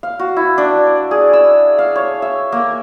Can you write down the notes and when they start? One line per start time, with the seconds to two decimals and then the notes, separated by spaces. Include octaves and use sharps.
0.03 F5
0.19 F#4
0.36 E4
0.58 D4
0.87 D5
1.11 G#4
1.33 E6
1.78 F5
1.96 C#5
2.22 E5
2.52 A#3